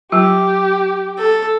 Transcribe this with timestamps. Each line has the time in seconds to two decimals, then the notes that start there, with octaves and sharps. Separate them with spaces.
0.12 F#3 F4 G4
1.18 A4